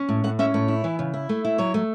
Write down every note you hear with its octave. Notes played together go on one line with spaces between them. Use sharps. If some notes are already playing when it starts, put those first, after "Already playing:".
Already playing: C#4
A2
A2 F#5
C#4 E5
A2 C#5
E4
E3
C#3
E4
A3
E4
F#3 C#5
A3